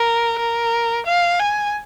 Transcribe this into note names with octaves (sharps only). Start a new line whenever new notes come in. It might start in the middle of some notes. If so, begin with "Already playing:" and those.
Already playing: A#4
A#4
F5
G#5